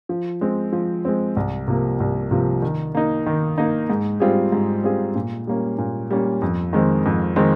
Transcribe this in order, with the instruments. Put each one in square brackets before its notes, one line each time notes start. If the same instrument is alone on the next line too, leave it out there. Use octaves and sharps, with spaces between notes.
[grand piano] F3
G#3 C4
F3
G#3 C4
C2
C3 F3 A#3
C2
C3 F3 A#3
D#3
A#3 D#4
D#3
A#3 D#4
G#2
G3 C4 F4 G#4
G#2
G3 C4 F4 G#4
A#2
G3 A#3 C#4
A#2
G3 A#3 C#4
F2
D#3 G#3 C4
F2
D#3 G#3 C4